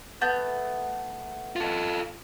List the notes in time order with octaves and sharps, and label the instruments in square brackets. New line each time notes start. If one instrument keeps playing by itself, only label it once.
[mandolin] A3 B3 G6
[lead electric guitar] F4 A4